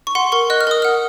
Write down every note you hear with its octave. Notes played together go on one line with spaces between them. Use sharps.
C#6
F#5 C6
A#4 C#6
D#5 F#6
F6
A#4 D#6
F#5 F6